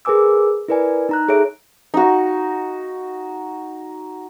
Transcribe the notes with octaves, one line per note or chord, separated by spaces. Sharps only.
G#4 A#4 B4 G#5 D6 E6
E4 A#4 B4 D5 G#5
D#4 A#5 F#6
G#4 A4 C#5 E5 D7
D#4 F#4